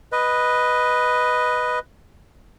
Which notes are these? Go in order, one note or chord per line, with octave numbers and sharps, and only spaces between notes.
B4 D#5